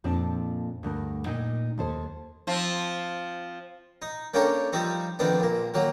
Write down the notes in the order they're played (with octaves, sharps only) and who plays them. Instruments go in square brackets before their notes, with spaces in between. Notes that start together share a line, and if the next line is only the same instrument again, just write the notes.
[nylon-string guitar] F2 A#2 C4 D4
D2 G2 A#4
A#2 D#4 G5
D#2 A4 C5
[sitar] F3 C4
[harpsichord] D#4
A#3 C#4 D4 G4 A4 A#4
F3 G3 C4 D#4
F2 D#3 B3 C4 D4
A#1 A#3
D#3 F#3 A#3